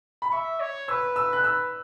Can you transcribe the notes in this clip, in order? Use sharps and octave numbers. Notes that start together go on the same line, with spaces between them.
B5
E5 C#6
C#5
B4 E6
E6
F#6
B4 E6